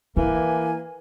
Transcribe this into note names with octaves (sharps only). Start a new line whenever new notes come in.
E3 A#3 E4 G#5